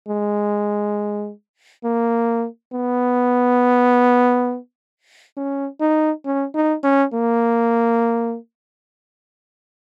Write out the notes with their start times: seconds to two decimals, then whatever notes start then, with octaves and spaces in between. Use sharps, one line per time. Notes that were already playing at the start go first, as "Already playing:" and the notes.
0.08 G#3
1.84 A#3
2.73 B3
5.37 C#4
5.81 D#4
6.26 C#4
6.55 D#4
6.84 C#4
7.13 A#3